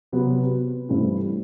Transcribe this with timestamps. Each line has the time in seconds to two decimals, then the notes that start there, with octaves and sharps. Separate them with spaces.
0.12 C3 F#3 B3
0.89 G2 E3 A3 C4 E4